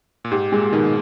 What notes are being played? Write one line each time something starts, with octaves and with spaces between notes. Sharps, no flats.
A#2
G#2 G4
A#2 G#3
B2 D#3